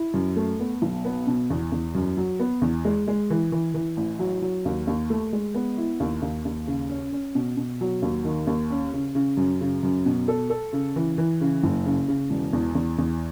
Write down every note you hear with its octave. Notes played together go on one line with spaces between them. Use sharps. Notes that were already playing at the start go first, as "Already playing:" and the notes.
Already playing: E4
F#2
A3
B3
B1
B3
B2
E2
E2
F#2
F#3
B3
E2
G#3
G#3
E3
E3
E3
A1
F#3
F#3
D#2
D#2
A3
G#3
B3
E4
D#2
D#2
D#2
C#3
C#4
C#4
B2
B2
F#3
D#2
D#3
D#2
C#4
C#3
C#3
F#2
C#3
F#2
B2
A4
A4
C#3
E3
E3
C#3
F#1
C#3
C#3
E1
E2
E2
E2